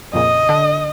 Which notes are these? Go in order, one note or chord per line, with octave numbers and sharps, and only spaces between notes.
F2 A#2 C#3 D#5
D3 D4